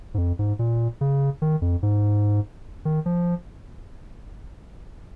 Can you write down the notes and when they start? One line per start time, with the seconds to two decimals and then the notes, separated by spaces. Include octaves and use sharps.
0.14 G#2
0.18 F2
0.39 G#2
0.59 A#2
1.01 C#3
1.42 D#3
1.62 F2
1.83 G#2
2.85 D#3
3.06 F3